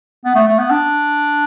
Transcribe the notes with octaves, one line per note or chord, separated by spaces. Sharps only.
B3
A3
A3
B3
D4